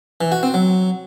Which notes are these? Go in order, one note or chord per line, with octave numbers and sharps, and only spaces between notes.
E3
F#4
C4
F#3